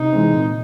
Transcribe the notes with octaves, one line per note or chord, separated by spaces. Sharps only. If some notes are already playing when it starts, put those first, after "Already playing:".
Already playing: C3 D#4
E3 G#3 C4
A#2